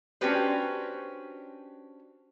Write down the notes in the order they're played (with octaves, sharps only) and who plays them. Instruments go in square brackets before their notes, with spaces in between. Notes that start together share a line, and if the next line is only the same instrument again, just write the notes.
[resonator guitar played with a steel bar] C#4 D4 F#4 G4 B4 C5